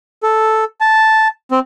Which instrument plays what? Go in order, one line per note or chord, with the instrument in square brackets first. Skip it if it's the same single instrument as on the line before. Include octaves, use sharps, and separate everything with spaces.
[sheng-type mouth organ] A4
A5
C4